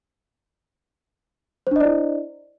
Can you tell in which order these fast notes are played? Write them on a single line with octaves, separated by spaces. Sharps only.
C5 D4 D#5 D5 E4